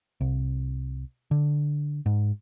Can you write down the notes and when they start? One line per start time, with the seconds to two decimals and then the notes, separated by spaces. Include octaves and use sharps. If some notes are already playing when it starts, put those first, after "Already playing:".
0.21 C2
1.31 D3
2.06 G#2